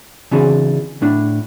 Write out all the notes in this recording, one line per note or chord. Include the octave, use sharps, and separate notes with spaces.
C#3 E3 C4 D4 F#4 G#4
A2 D4 E4